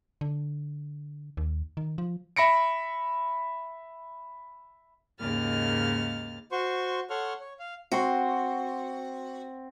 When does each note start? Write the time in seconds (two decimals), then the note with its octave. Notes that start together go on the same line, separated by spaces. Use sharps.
0.21 D3
1.37 D#2
1.77 D#3
1.98 F3
2.36 E5 B5 A#6 C#7 D7
5.18 D#2 G#2 C#3 A#3 F6 A6
6.52 F#4 C5 C6 C#6
7.10 A4 C#5 F#5 C6 C#6 F6
7.40 C#5
7.59 F5
7.92 C4 F#4 F#5 C6